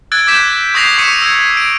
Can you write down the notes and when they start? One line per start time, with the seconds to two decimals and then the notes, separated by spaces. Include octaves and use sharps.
0.12 E6 F#6 G#6 A6 D7
0.27 D6 E6 F#6 G6 B6 E7
0.74 C#6 D#6 G6 A#6 C7 F7
0.98 C#6 B6 C#7 D#7 E7
1.22 E6 G#6
1.57 D7